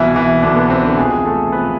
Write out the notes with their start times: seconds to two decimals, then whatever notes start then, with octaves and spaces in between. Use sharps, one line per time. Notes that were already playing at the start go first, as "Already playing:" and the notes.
Already playing: C2 B2 E3 E4
0.15 E3 E4
0.43 C2 B2 D3 D4
0.56 B3
0.70 C4
0.84 D3 D4
0.97 E2 C3 F3 G#3 G#4
1.25 A3 A4
1.52 C3 F3 B3 B4